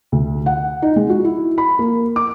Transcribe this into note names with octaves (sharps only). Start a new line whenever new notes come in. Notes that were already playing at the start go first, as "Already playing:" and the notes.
D2
F#5
D#4
G#3
F#4
E4
B5
A#3
D6